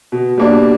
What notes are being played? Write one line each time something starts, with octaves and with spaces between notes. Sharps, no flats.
B2
G3 A#3 D4